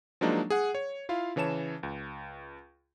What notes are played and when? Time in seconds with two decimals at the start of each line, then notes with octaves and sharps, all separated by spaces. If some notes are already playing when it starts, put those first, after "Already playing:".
0.21 F3 F#3 G#3 A#3 D4 D#4
0.50 G#4 F#5
0.75 C#5
1.09 E4 F4 F5
1.36 C#3 E3 C#5 A5 E7
1.83 C#2